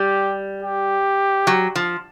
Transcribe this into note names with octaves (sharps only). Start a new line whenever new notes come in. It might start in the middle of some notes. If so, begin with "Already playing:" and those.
Already playing: G3 G4
G4
F#3
F3